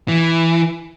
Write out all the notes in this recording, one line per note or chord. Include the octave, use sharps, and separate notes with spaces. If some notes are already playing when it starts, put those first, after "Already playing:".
E3